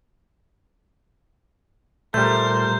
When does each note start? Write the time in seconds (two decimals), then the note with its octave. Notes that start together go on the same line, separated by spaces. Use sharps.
2.14 A#2 G3 A3 A#4 C5 G6